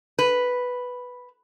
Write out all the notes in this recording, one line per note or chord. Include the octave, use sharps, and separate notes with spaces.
B4